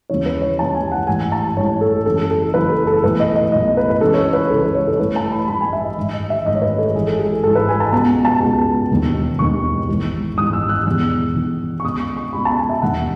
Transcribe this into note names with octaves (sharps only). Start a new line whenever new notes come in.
D#2 C#3 E3 C#5
B4
C#5
D#2 C#3 E3 A5
G#5
F#5
A1 G#2 E3 G#5
A5
A1 G#2 E3 C#5
A4
F#1 F#2 E3 A4
A4
F#1 F#2 E3 B4
A4
A4
B1 A2 E3 B4
D#5
D#5
B1 A2 E3 D#5
B4
B4
C#2 C#3 E3 A4
C#5
B4
B4
C#2 C#3 E3 A4
B4
C#5
A4
A1 A2 E3 B4
A5
B5
A1 A2 E3 B5
G#5
E5
D#5
A1 G#2 D#3
D#5
E5
A1 G#2 D#3 D#5
C#5
B4
A4
G#1 G#2 E3 G#4
A4
G#4
A4
G#1 G#2 E3 A4
B4
G#5
A5
C#2 B2 A5
A5
C#2 B2
E1 D#2 D#3
E1 D#2 D#3 C#6
G#1 G#2 E3
G#1 G#2 E3 D#6
E6
F#6
E1 E2 D#3 E6
E1 E2 D#3
C#6
C#2 B2 D#6
C#6
C#6
C#2 B2 B5
A5
G#5
E5
E1 D#2 D#3 F#5